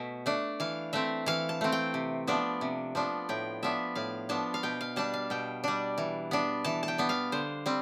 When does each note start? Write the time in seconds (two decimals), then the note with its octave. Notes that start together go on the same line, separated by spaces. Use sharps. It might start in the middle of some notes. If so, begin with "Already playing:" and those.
Already playing: B2 A3 E5
0.26 A3 D4
0.60 E3 F5
0.93 A3 C4 E5
1.26 E3 F5
1.49 A5
1.61 A3 C4
1.72 G5
1.94 C3
2.27 F3 B3 D4
2.61 C3
2.95 F3 B3 D4
3.29 A2 G5
3.63 F3 B3 D4 E5
3.95 A2 F5
4.29 F3 B3 D4 A5
4.54 F5
4.63 B2 G5
4.81 F5
4.96 G3 D4 A5
5.14 F5
5.30 B2 G5
5.64 G3 D4
5.98 E3
6.31 B3 D4
6.64 E3 A5
6.83 A5
6.88 G5
6.98 B3 D4
7.09 F5
7.32 D3 C5
7.66 G3 C4